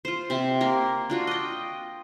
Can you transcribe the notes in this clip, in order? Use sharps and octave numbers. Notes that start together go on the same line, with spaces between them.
F4 C5
C3 C4 E5 C6
A#3 A#4 C6
D4 F4 F#4
D#5 G5